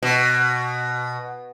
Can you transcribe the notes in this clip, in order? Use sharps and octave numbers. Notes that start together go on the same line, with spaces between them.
B2